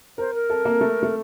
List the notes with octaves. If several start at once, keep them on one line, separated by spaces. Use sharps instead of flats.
A#4 C5
A#4
A4
A#3
A3
A3